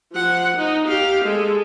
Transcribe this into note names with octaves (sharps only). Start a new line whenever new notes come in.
F3 F#5
D#4
G4 F5
G#3 A4